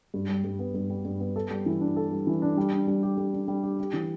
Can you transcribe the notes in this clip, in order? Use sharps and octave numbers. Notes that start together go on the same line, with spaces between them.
G2
G3
G2
B3
G2
G3
G2
B3
A4
G3
E3
D4
A4
G3
E3
D4
G3
D4
G3
G4
G3
D4
G3
G4
G4
E3